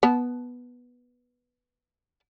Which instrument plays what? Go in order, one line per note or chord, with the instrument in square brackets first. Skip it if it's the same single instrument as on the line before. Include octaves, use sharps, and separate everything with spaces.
[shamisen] B3 A5